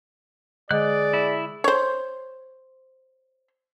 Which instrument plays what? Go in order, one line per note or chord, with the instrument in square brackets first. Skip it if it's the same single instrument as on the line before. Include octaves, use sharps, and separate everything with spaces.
[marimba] D3 G#3 D#5 [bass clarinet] G#4 [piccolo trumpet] D5 [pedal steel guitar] F#6
[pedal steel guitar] E4
[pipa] C5 C#5